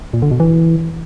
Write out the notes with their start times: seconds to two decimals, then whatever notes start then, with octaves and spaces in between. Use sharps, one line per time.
0.13 A#2
0.22 D3
0.31 B2
0.40 E3